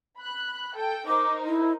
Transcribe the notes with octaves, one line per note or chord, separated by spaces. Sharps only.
B5 F#6
A4 G5
D#4 A#4 C5 D6
E4